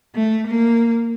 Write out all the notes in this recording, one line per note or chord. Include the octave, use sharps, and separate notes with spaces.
A3
A#3